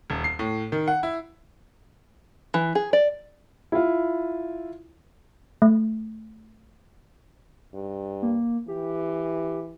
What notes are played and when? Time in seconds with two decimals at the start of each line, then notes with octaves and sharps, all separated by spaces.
0.10 D#1
0.24 C7
0.39 A2
0.72 D#3
0.88 F#5
1.03 E4
2.54 E3
2.75 G#4
2.93 D5
3.72 E4 F4
5.62 A3
7.74 G2
8.22 A#3
8.68 E3 G4